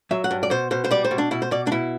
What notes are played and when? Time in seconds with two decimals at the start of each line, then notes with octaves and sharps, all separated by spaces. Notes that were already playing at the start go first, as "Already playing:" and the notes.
0.11 F#3 E5
0.24 F#5
0.31 G2
0.43 D5
0.50 B2 C5
0.71 B2 C5
0.85 C5
0.91 G3 D5
1.05 C5
1.11 B2
1.18 D4
1.31 B2 E4
1.42 C5
1.51 B2 D5
1.67 D4
1.72 B2 E4